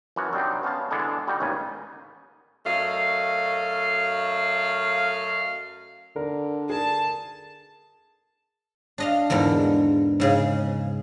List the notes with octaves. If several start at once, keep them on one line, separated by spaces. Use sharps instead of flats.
F#2 E3 F3 F#4
C3 F#3 G3 C4 D4 D#4
B3 C#4 C5 F5 A5
D3 E3 G#3 B3 D4 A4
G3 D#4 F#4
A1 D#2 G#2 C#3 B3 G#5
F#2 A3 D#5 F5
D3 A#4
G#4 A#4 A5
D4 D#5 F5
E2 G#2 D3 A#4
G#2 C#3 G#4